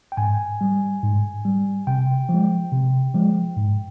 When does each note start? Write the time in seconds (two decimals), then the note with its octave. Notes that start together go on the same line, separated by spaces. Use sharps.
0.12 G5
0.17 G#2 G#5
0.61 G3
1.03 G#2
1.45 G3
1.87 C3 G5
2.29 F3
2.34 G#3
2.72 C3
3.14 F3 G#3
3.57 G#2